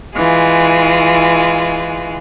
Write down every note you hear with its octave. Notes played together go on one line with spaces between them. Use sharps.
E3 G#3 F4